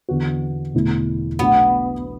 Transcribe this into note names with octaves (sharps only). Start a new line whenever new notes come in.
E2 D3 B3 F#4
E1 E2 D3 A3 E4
B1 B2 A3 B3 D4 F#4